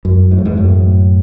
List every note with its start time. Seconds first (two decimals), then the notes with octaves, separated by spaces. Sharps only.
0.05 F#2
0.31 G#2
0.38 A2
0.45 E2 G#2
0.57 F#2 A2